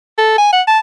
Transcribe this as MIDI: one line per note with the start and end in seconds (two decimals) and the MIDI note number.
0.18 0.35 69
0.38 0.48 80
0.53 0.62 78
0.68 0.79 81